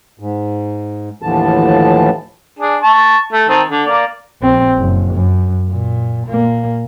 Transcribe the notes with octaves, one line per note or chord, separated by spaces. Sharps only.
G#2
D#2 A2 D3 E3 F3 A5
D4 G#4
A5 C#6
A3
D#3 C4 A5
D3
A#3 D5
A#1 C4
F#1
F#2
A#2
A#2 A#3